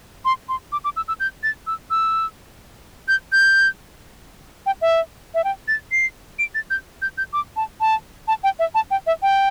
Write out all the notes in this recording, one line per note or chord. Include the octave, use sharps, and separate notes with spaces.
C6
C6
D6
D6
E6
E6
G6
A6
E6
E6
G6
G6
G5
E5
E5
G5
A6
C7
D7
A6
G6
G6
G6
D6
A5
A5
A5
G5
E5
A5
G5
E5
G5